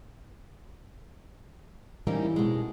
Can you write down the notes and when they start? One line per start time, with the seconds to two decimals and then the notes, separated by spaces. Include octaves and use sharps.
2.07 E3 G3 A#3 C4 C#4 D#4
2.36 B2 G#3